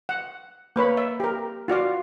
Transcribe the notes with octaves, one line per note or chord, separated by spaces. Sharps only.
F#5
A#3 B4 C#5 B5
E5
G4 A#4
F4 F#4 D5 F5